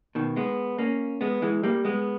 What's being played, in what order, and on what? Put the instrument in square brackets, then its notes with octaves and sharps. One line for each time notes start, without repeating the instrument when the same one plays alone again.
[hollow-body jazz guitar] B2 D#3
G#3 B3
A#3 C#4
G#3 B3
E3 G#3
G3 A#3
G#3 B3